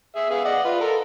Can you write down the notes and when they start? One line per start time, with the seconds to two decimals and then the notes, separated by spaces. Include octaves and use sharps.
0.16 G#4 E5
0.31 B3 G#4 F5
0.45 D5 D#5 F#5
0.65 F4 B4
0.80 A4 A#4